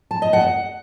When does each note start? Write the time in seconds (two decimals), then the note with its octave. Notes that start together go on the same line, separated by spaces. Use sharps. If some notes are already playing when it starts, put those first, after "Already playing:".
0.11 A5
0.22 D#5
0.33 F#5